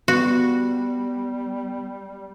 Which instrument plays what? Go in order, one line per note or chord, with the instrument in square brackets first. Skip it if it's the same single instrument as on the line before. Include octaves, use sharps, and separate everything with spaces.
[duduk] G3 [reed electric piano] B3 [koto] F#4